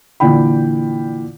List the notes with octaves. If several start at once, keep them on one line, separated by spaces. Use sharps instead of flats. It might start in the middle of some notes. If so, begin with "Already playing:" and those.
A#2 D3 E3 G5 B5